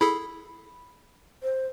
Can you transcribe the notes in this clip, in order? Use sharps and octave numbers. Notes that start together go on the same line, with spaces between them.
E4 G#4 A4 B5
C5